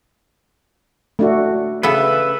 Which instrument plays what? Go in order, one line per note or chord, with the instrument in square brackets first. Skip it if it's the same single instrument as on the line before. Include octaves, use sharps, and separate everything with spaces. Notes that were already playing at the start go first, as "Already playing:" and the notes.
[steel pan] A3 D4 F#4
[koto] C#3 B3 A4 [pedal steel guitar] B4 E5